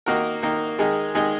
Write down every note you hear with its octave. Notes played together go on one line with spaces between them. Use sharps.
D#3 A#3 D#4 F#4 A#4
D#3 A#3 D#4
D#3 G#3 D#4 G#4
D#3 G#3 D#4 G#4